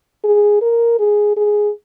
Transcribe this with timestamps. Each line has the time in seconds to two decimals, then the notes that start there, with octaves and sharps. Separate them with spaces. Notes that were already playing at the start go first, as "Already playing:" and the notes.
0.24 G#4
0.62 A#4
0.99 G#4
1.37 G#4